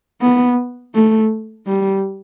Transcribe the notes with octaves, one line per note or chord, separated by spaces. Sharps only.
B3
A3
G3